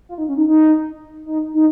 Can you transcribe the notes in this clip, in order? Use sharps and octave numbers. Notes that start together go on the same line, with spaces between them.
F4
D#4
C#4
D#4
D#4
D#4
D#4